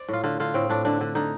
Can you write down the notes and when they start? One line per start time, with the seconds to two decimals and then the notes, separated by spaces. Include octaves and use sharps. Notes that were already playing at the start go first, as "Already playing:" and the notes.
Already playing: C5 D5
0.09 A2 F4
0.24 D3 F4
0.40 D3 F4
0.54 A2 C4
0.70 A2 D4
0.85 D3 D4
1.01 D3
1.15 D3 D#4